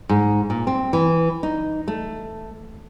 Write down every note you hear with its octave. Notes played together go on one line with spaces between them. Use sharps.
G#2
A#2
C4
E3
D#4
A3